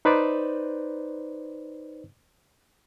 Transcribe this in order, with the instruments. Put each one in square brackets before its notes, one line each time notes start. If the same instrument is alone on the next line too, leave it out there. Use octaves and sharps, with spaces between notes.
[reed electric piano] D#4 B4 C5 D5